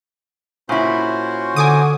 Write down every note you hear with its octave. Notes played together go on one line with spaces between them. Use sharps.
A#2 C#4 E4 F#4 C5
D3 G#5 D6 D#6